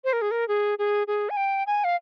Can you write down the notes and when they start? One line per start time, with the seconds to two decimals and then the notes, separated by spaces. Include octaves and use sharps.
0.04 C5
0.13 A#4
0.22 G#4
0.31 A#4
0.48 G#4
0.79 G#4
1.07 G#4
1.30 G#5
1.37 G5
1.67 G#5
1.84 F5